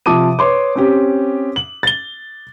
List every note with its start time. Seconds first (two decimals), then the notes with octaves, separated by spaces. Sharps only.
0.06 C3 F3 A5 D6 D#6 D#7
0.39 B4 C#5 C6 D6
0.76 C4 C#4 G4
1.56 F#7
1.83 A6 G7